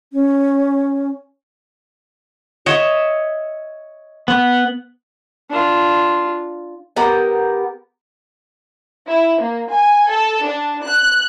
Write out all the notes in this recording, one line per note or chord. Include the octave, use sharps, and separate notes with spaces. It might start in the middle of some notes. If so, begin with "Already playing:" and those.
C#4
C#5 D#5 E5
B3
D4 F4
B3 G4 A#4 F#5
E4
A#3
G#5
A4
D4
F#6